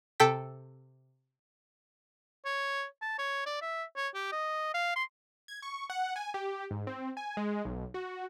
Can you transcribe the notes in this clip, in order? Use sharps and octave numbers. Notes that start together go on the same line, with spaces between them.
C3 A4 G5 B6
C#5
A5
C#5
D5
E5
C#5
G4
D#5
F5
C6
G#6
C#6
F#5
G#5
G4
G#2
C4
G#5
G#3
B1
F#4